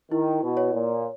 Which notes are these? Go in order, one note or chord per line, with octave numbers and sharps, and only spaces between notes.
D#3 E4
B2
C#5
A#2